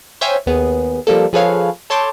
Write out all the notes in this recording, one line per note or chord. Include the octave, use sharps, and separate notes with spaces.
C5 C#5 E5 F5 G5 G#5
D#2 B3 G#4
F3 G3 A#3 A4
F3 G#4 A4 B4 C#5 F5
A4 C#5 A5 C6 D6 G6